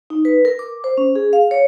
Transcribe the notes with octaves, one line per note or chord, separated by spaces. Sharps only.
D#4
B4
A#4
D6
C5
C#4
G#4
F5
C#5